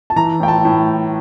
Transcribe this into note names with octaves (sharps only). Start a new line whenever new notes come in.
A5
E3 A#5
A2 G5
A5
A2